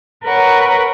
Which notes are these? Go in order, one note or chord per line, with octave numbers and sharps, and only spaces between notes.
A#4 B4 C#5 F#5